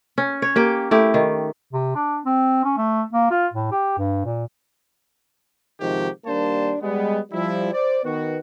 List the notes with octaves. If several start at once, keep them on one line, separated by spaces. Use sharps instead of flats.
C#4
C#5
A#3 G4 G5
A3 E4 G4
D#3
C3
D4
C4
C#4
A3
A#3
F4
A2
G4
G2
A#2
G#2 C3 D#3 F3 F#4 G4
D#2 G3 A#3 D4 C5 A5
G3 G#3 B3
F3 G3 E4
C5 D5
D#3 B3 F#4